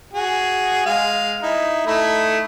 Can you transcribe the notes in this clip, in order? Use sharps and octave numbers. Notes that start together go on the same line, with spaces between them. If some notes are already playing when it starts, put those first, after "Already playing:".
F#4 G#4
G#3 F5
D#4 E4
A3 D#4 E4